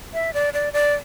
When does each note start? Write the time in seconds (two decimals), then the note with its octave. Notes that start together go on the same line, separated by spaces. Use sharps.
0.14 E5
0.34 D5
0.53 D5
0.73 D5